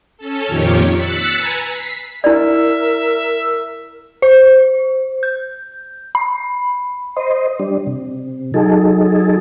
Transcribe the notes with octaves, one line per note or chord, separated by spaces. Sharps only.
C#4 A4
F2 A#2 D#3 F3 G4 C#5
E6 F#6 A6 B6 C#7
B4 G#5 A#5
B6 C7
E4 A#4 D5 E5
C5
G6
B5
C5 D#5
G3 D4
C3
F#3 D#4 G#4 A4